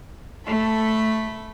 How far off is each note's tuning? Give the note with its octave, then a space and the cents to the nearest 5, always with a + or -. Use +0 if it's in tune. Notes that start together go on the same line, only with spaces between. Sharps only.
A3 +0 A4 +0 B5 +0